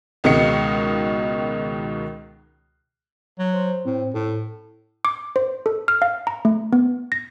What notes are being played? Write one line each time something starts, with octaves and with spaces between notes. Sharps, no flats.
C#2 B2 D#3 G#3 D#5 C#7
F#3
C5
A2 C4
A2 A4
D6
C5
A4
F6
F5
A#5
A3
B3
A#6